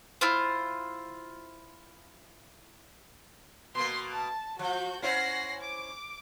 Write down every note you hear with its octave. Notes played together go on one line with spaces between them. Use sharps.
E4 F4 C5
B2 A#3 C6
A5
F3 F#4 G6
C#4 E4 C5 F#5 A#6 C7
D6